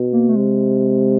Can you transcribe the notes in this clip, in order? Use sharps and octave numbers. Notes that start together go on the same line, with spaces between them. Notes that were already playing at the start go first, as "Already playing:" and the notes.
Already playing: B2
A#3
A3
C3 G#3